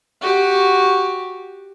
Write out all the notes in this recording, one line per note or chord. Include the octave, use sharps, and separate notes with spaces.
F#4 G4